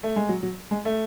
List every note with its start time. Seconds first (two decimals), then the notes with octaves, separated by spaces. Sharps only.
0.03 A3
0.16 G#3
0.29 F#3
0.43 F#3
0.71 G#3
0.85 A3